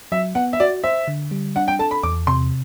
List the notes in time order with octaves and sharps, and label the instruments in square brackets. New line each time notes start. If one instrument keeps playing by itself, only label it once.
[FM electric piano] F#3 [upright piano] E5
[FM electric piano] B3 [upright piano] F#5
[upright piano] E5
[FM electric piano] F#4 [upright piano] D5
[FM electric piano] C5 [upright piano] E5
[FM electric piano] D3
G3
[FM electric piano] D4 [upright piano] F#5
[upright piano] G5
[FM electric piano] A4 [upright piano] A5
[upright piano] B5
[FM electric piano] E2 [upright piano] D6
[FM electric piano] C3 [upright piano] C6